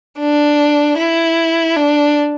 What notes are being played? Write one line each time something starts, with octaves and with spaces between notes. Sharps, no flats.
D4
E4
D4